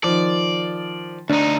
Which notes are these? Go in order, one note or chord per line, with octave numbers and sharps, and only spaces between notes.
D#3 F3 D5
D2 D4 D#4